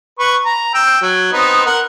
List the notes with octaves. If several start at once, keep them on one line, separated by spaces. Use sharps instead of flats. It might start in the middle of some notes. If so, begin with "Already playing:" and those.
B4 C#6
A#5
G5 E6
F#3
B3 C4 D#4
A#4 F#5